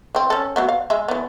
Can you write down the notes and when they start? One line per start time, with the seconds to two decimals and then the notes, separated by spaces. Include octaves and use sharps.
0.15 E3 C4
0.30 C#4 A4
0.56 F#3 A3 B3
0.69 F5
0.90 G#3 E5
1.08 E3 B3